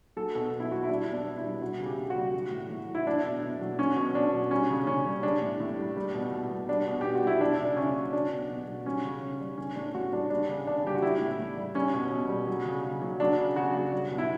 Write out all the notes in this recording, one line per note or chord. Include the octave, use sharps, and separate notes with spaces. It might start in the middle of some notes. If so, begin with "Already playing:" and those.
F#3 A4
B2 A4
B2
E4
F#3 F#4
E4
G3 D4
B2
D4
B2
E4
G3
G3 F#4
C#3
G4
C#3
F#4
G3
F#3
A2
A2
F#3
E4
F#3 D4
B2
B2
F#3
F#3 C#4
B2
B2 D4
F#3
G3 C#4
C#3
C#3 C#4
G3
G3 D4
A2
A2
G3
G3
B2
B2
G3
G3 D4
B2
B2 G4
F#4
G3 E4
F#3 D4
C#3
D4
C#3 C#4
F#3
F#3 D4
B2
B2
F#3
G3 C#4
C#3
C#3
G3
G3 C#4
A2 D4
A2 F#4
G3 D4
G3 D4
C#3
C#3 D4
G3 G4
F#4
G3 E4
A2
A2
G3
G3 C#4
B2
B2
G3
F#3
C#3
C#3
F#3
F#3 D4
C#3
C#3 F#4
F#3
G3
B2
E4